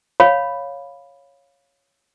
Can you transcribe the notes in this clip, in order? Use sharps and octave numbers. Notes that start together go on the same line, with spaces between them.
C#5 F5 B5